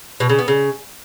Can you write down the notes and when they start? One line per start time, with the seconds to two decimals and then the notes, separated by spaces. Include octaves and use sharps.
0.20 B2
0.29 C#3
0.39 B3
0.48 C#3